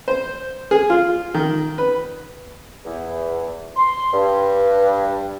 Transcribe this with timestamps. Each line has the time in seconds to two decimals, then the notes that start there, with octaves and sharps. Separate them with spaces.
0.08 C5
0.71 G#4
0.90 F4
1.34 D#3
1.78 B4
2.85 E2
3.76 C6
4.13 G2